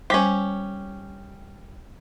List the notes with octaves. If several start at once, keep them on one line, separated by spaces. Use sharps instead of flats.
G3 C#4 G4 C5